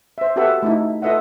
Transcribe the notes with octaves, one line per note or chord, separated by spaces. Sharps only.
C5 E5
F#4 G4 A4 B4 E5 F#5
A3 D#4 E4
F4 A4 B4 D#5 E5 F#5